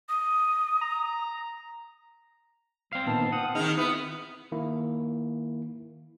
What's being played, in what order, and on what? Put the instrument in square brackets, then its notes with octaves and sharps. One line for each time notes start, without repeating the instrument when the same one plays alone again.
[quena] D#6
[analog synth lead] A#5
[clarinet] G3 [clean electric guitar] C4 F5
[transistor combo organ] A#2 D#3 B3 [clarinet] A5
[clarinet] F#5 [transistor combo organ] D#6
[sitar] D#3 D#4 [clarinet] G#4 [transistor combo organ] F6
[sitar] B3 [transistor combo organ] E4 [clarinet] D#6
[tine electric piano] D#3 A#3 E4